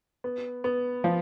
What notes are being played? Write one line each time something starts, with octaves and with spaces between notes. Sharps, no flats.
B3
B3
F3